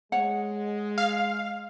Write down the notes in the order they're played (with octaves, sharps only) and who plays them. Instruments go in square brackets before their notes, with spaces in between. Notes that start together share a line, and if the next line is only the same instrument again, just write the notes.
[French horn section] G#3 [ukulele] C#5 F#5
[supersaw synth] F5